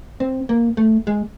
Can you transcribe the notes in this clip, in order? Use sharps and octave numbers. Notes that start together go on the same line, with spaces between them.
C4
A#3
A3
G#3